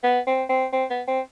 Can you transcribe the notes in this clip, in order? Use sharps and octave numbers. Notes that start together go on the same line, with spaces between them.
B3
C4
C4
C4
B3
C4